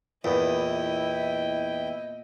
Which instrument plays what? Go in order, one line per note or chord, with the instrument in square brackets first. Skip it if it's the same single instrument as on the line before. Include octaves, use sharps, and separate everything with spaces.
[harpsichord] E2 [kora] A#2 B3 [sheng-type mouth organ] E4 G5 [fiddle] D#5